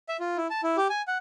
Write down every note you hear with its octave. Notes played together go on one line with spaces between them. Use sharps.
E5
F4
E4
A5
E4
G4
G#5
F#5